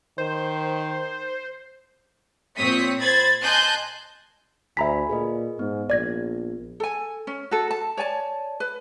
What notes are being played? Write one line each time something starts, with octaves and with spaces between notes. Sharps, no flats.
D#3 C5
A#2 C4 C#5 D#6 B6 C#7
C5 B5 G#6 A6
D#5 G#5 A5 C6 F#6 G6
D2 E5 G#5 A#5 B5 B6
A#2 G#4 B4 D#5
G#2 B3
A#1 D5 G#6 A#6
A4 G#5
C#4
F#4 A4
A5
C#5 D5 G#5 A5
B4